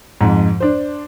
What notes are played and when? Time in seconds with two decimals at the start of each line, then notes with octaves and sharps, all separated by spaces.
0.21 F2 G#2
0.60 D4 C5